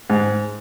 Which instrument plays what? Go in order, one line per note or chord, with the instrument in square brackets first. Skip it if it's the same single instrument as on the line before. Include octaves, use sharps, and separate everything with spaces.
[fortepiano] G#2